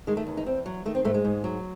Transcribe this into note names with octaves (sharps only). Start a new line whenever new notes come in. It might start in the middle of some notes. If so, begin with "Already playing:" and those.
D#3 G#3
A3
E2
D#4
E2 C4
F#3
D#3 A3
C4
G#2 A3
G#3
G#2
F#3